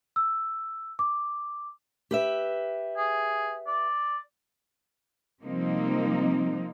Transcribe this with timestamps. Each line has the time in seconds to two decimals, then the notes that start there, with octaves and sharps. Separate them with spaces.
0.16 E6
0.99 D6
2.11 G4 B4 E5
2.97 G#4
3.67 D5
5.43 C3 F3 G3 A#3 C4 D#4